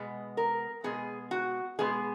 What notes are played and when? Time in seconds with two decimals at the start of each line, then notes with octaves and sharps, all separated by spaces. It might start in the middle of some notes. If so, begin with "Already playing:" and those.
Already playing: B2 G#3 B3
0.37 A#4
0.84 B2 G#3 B3 G#4
1.31 F#4
1.79 B2 G#3 B3 G#4